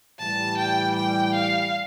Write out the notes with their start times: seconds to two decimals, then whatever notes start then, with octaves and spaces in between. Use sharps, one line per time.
0.19 A2 E3 G3 A5
0.57 G5
0.95 G5
1.33 F5